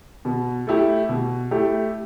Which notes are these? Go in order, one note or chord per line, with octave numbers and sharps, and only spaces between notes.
B2
A3 E4 G4
B2
A3 E4 G4